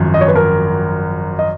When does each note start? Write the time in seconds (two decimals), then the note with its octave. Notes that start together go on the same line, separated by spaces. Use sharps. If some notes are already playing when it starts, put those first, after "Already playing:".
Already playing: G#1 F#2 F3
0.14 D#5
0.21 C#5
0.28 B4
0.36 A#4
1.39 D#5